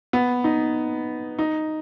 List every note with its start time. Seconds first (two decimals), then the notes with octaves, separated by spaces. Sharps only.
0.13 B3
0.44 D#4
1.39 D#4